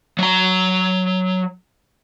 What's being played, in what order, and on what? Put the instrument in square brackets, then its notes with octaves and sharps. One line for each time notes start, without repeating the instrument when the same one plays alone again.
[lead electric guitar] F#3 A#5